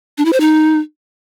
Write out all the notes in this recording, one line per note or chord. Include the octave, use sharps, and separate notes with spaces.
D4
E4
C5
D#4